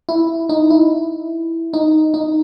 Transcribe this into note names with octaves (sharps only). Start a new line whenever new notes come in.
E4
D#4
E4
D#4
D#4